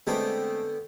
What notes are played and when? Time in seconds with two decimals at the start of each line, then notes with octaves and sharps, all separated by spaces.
0.07 D3 G#3 A3 B3 C4 G5